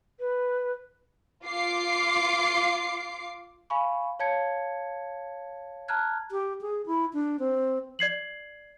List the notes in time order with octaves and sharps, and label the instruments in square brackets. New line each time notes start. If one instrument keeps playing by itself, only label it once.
[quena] B4
[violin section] F4 D6 C7
[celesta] F5 G#5 B5 C#6
C#5 F5 A5 G#6 C#7
A5 A#5 F6 F#6 G#6
[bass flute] G4
G#4
E4
D4
C4
[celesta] D5 G#6 C7 F#7